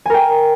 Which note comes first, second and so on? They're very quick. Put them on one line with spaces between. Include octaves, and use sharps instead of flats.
G#5 A#4 G5